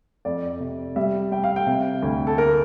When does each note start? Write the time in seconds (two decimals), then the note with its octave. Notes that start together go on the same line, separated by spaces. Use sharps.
0.25 F2 D5
0.60 C3
0.96 G3 E5
1.31 G3 G5
1.44 F5
1.56 G5
1.66 C3
2.03 D2
2.27 A4
2.38 A#3 A#4